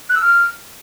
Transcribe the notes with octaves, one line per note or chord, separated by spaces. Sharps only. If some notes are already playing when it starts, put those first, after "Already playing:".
F#6
E6
F6